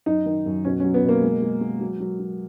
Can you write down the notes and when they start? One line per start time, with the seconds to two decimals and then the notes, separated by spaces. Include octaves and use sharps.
0.06 F#2 D#4
0.26 D#3
0.46 F#2
0.65 B2 C#4
0.80 C#4
0.84 F#3
0.94 B3
1.03 B2
1.09 A#3
1.23 G#3
1.42 G#3
1.61 G#3
1.81 F#3
2.00 F#3
2.20 F#3